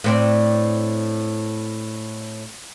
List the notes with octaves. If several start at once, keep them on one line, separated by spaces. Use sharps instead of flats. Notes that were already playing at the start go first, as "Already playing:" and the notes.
A2 C4 D4